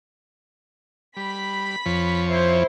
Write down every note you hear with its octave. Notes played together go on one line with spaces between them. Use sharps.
G3 B5 B6
F2 F3 C#5
E4 C5